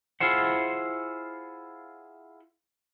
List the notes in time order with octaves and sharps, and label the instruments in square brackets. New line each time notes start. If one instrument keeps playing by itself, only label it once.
[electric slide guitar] E4 F4 G#4 C5 F#5